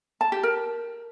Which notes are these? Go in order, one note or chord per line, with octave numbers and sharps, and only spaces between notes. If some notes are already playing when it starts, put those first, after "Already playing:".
A5
G4
A#4